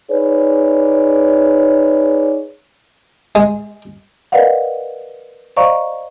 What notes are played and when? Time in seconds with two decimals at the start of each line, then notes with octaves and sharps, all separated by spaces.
0.11 D#4 G#4 B4 C#5 D5
3.35 G#3
4.32 A#4 B4 D5 D#5 F5 F#5
5.56 C5 D5 D#5 F5 A#5 C#6